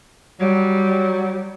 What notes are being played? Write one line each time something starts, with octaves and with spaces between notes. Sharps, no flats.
F#3 G3